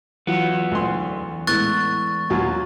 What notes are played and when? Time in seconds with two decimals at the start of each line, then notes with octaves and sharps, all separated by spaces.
0.27 E2 E3 F#3 F4 B4 F#5
0.71 D2 C6
1.47 A2 G#3 B3 C#6 F#6 A6
2.30 D#2 F#3 F4